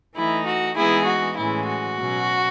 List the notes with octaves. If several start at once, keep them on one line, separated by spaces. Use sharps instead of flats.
E3 A3 D#4 E4
F#4
E3 G#3 B3 D#4 E4 G#4
F#4
A2 E3 G#3 C#4 E4
F#4
B2 F#3 C#4